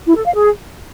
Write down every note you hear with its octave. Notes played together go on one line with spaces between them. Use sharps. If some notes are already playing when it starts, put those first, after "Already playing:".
E4
A4
F5
G#4